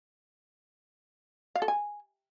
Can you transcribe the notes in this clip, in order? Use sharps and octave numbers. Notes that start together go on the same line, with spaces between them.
F5
A4
G#5